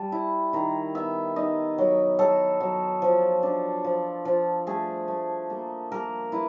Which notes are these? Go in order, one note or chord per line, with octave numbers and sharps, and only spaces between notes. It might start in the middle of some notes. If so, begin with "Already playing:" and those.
Already playing: G3 A5
E4
D#3 A#5
B3 E5
D#4 D#5
F#3
F#3 A4
F#3
F3
D4
F3
F3
A3 G#4
A3
A#3 A4
A#3 A#4
E4 B4